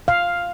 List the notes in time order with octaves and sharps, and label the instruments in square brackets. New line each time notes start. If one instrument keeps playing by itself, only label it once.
[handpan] F5